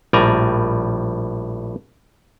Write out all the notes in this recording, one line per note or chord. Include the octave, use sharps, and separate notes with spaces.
A#1 A2 G3 D5 G#5 A#5